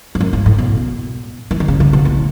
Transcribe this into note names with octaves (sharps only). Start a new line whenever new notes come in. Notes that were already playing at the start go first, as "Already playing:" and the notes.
G#2
F#2
G#2
A2
B2
E3
D#3
C#3
C#3
B2
A2